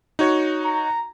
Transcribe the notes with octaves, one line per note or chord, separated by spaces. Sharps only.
D#4 F#4 C#5
A#5